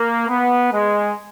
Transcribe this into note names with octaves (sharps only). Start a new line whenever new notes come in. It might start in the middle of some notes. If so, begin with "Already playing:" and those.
Already playing: A#3
B3
G#3